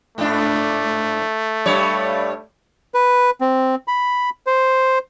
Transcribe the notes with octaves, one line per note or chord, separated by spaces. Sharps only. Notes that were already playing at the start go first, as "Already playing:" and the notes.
G#2 A3 D4
G2 G3 C#5
B4
C4
B5
C5